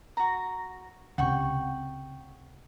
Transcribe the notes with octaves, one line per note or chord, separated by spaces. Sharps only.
F#4 A#5
C#2 C3 F#5 G5 C#6